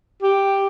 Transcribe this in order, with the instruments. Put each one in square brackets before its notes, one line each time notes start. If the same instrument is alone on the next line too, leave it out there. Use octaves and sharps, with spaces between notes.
[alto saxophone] G4